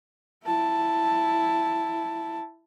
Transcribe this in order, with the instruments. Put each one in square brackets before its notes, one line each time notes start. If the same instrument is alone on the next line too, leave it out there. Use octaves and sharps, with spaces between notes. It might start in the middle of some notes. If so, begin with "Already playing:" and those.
[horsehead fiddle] E4 A5